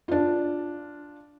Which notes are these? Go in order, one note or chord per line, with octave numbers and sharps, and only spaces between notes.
D4 F4